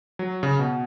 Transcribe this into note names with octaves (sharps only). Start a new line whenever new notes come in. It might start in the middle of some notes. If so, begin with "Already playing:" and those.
F#3
C#3
B2